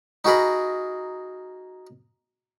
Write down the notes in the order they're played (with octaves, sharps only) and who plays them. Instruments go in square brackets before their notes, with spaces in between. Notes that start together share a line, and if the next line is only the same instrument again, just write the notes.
[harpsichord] D#4 F#4 G#4 A#4 B5